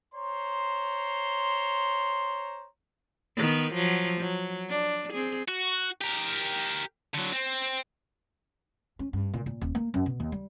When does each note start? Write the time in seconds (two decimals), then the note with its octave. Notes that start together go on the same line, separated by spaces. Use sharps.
0.14 C5 C#5 A#5 C6
3.37 D#3 B3
3.74 F3 F#3
4.21 F#3
4.69 D4
5.13 C4 G#4
5.48 F#4
6.01 G4 A#4
7.14 D3 F#3
7.33 C4
8.99 C#4
9.13 G2
9.34 A#2
9.46 A#2
9.61 D#1
9.75 A#3
9.94 F#2
10.06 B2
10.20 D#2
10.32 G3